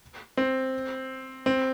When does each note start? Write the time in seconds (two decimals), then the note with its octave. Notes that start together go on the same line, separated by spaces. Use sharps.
0.37 C4
1.46 C4